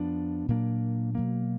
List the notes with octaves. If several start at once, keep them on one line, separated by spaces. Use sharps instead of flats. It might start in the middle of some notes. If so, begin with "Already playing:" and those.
Already playing: F2 F3 B3 D4
A#2 F#3 A#3 D4
B2 F#3 A#3